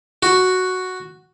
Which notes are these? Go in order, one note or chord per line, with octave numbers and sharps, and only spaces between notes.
F#4